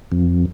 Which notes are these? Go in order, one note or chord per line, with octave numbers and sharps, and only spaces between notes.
F2